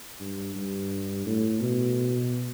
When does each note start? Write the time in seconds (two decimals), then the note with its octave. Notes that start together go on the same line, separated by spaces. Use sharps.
0.20 G2
0.55 G2
1.26 A2
1.61 B2